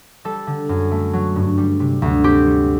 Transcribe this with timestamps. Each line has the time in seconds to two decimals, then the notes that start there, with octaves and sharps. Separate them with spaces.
0.25 G3 A4
0.47 D3
0.69 F#2
0.91 A3
1.13 F#3
1.36 G2
1.58 G3
1.80 C3
2.02 D2
2.24 C4 G4
2.46 G3